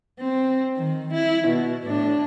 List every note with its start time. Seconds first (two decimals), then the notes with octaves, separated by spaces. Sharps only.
0.20 C4
0.76 D#3
1.14 E4
1.48 B2
1.86 A2 D4